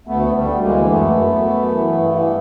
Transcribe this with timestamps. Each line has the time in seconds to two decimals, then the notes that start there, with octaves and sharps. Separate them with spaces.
0.07 D2 A3 B3
0.28 D2
0.34 G3 A3
0.49 D2
0.62 G#3 A#3
0.69 E3
0.89 F#2 A3 B3
1.10 F#2
1.30 F#2
1.51 F#2
1.71 E3
1.92 G2
2.12 E3